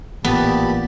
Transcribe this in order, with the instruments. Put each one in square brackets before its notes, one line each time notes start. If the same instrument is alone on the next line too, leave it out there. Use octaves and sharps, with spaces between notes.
[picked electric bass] A1 [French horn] A#2 [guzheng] B3 [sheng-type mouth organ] G4 A5 B5